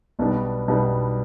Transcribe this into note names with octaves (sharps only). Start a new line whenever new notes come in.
B1 B2 G3 B3 D4
B1 B2 G3 B3 D4